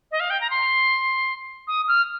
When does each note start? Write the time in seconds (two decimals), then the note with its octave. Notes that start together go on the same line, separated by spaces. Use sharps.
0.11 D#5
0.20 F5
0.30 G5
0.41 A#5
0.50 C6
1.68 D#6
1.88 F6